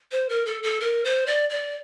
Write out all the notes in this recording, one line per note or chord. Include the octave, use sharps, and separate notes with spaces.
C5
A#4
A4
A4
A#4
C5
D5
D5